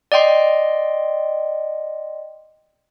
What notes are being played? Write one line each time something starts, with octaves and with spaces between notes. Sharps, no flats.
D5 D#5 G5 C6